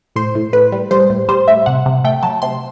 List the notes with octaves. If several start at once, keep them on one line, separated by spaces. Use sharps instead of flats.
A2 C5
A2
A2 B4
G3
G3 C5
A2
G3 C5
A2 E5
C3 F#5
C3
A3 G5
F#3 A5
C3 C6